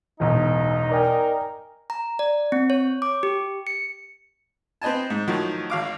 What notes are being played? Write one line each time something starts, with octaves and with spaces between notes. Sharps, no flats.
E1 B1 A2 C#3 E3 D#4
A#4 D5 G5 G#5
A#5
D5
C4
C#5
D6
G4
C#7
C4 B4 D#5 G#5 A5
G#2
A2 D#3 F3 F#3
G#1 F5 D6